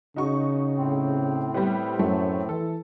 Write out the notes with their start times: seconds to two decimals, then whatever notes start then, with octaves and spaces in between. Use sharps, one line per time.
0.16 C#3 D#4 F#4 C#6
0.78 A2 C4
1.54 G3 B3
1.99 F#2 A3
2.49 E3 A4